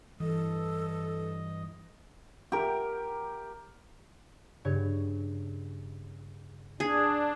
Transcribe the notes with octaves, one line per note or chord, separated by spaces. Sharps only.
G2 E3 A4 D#5
G4 A#4
G2 C#3 C#5
D4 G#4